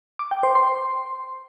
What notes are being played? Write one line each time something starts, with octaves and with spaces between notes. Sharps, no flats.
D6
G5
C5
C6